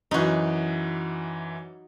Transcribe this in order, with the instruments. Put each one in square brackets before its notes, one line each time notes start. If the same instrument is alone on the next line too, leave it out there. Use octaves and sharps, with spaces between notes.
[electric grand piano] F#2 E3 [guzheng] D#4 F#4